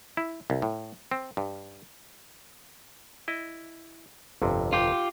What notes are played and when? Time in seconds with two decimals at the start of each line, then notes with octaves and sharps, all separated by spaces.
0.17 E4
0.50 C2
0.62 A2
1.11 C4
1.37 G2
3.28 E4 D#5
4.42 G1 F2 C3
4.73 F4 G4